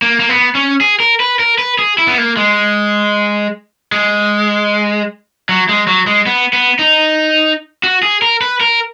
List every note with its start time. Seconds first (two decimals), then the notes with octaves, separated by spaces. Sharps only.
0.02 A#3
0.20 A#3
0.29 B3
0.55 C#4
0.81 G#4
1.00 A#4
1.20 B4
1.39 A#4
1.59 B4
1.79 G#4
1.98 E4
2.08 B3
2.18 A#3
2.37 G#3
3.92 G#3
5.49 F#3
5.69 G#3
5.87 F#3
6.07 G#3
6.26 B3
6.53 B3
6.79 D#4
7.83 F#4
8.03 G#4
8.22 A#4
8.41 B4
8.61 A#4